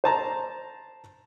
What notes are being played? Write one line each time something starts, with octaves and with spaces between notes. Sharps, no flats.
C5 A5 A#5